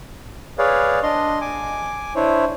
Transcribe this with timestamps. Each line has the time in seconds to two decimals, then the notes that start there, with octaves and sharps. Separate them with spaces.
0.58 G#4 B4 C#5 D5 F5
1.03 D4 D#5 C6
1.41 G#5 D6
2.16 D4 E4 C5 C#5